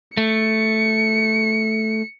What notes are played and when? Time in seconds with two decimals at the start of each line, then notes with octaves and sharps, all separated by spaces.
0.17 A3 C#7